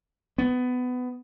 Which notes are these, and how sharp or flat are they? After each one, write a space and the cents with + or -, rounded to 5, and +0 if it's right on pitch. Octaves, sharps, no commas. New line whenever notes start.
B3 +20